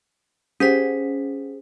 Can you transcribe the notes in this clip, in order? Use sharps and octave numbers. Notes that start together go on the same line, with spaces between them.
C#4 G4 G#4 C5 B6